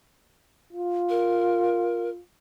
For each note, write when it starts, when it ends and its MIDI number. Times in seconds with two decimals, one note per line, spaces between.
0.73 2.20 65
1.10 2.09 70